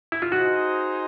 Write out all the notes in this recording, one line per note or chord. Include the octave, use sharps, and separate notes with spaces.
E4
F4
D#4 F#4 G#4 C5 D#5